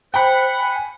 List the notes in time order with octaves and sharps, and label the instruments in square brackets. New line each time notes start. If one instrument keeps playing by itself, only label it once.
[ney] C5 [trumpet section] F#5 [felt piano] G5 B5
[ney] G#5